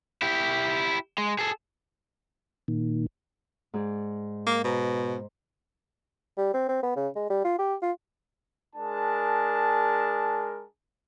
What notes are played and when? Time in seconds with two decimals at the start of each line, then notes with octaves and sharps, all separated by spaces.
0.22 E4 G4
1.18 G#3
1.39 G#4 A4
2.68 A#2 D#3
3.74 G#2 G#4 D5
4.47 A#3
4.64 B2 C5 A#5
6.37 G3
6.54 C4
6.69 C4
6.83 B3
6.96 C#3
7.15 G#3
7.30 G3
7.44 F4
7.59 G4
7.82 F4
8.76 G#3 D4 G#4 A#4 A5